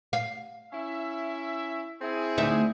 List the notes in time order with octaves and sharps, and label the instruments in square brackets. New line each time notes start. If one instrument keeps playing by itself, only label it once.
[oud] F5
[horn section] C#4 E4 E5
C4 E4 G#4
[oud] D2 D#4 E5